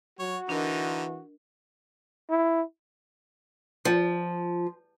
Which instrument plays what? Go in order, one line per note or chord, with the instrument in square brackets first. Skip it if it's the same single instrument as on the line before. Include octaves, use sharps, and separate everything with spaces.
[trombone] F#3 [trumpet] F#4 [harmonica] C#5
[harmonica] D3 D#4 [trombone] E3 [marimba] D4 A#4 D#5
[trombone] E4
[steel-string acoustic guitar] F3